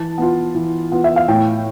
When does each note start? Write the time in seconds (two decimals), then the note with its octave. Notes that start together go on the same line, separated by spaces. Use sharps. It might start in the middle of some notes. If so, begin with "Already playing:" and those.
Already playing: E3 A5
0.18 B3 F4
0.55 E3
0.91 B3 F4
1.04 E5
1.16 F5
1.28 A2 G5